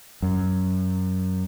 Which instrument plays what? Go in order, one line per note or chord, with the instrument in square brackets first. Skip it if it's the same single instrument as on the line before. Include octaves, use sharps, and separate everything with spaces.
[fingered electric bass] F#2